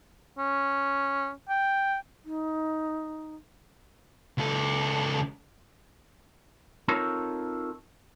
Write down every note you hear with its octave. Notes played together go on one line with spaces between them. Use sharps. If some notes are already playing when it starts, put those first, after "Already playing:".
C#4
G5
D#4
C#2 A4
C4 D#4 F4 A4 A#4 C#5